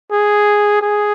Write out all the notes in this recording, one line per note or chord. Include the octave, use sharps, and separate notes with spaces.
G#4
G#4